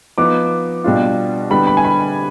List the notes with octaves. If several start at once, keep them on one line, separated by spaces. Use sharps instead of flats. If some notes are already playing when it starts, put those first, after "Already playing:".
F3 B3 D#4 D6
B2 G3 D4 F4
D3 G3 B3 B5
B5
G#5
B5